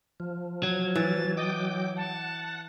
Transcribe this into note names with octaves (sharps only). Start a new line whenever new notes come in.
F3
F#3 G#6
E3 A6
D#5 G5 D6
F#5 A5